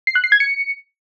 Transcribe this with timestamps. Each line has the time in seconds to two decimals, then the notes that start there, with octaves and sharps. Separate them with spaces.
0.07 C7
0.15 F#6
0.24 C7
0.32 G#6
0.40 C#7